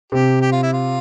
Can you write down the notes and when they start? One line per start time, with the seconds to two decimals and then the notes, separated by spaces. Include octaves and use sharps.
0.12 C3 G4
0.41 G4
0.52 F4
0.63 E4
0.73 F4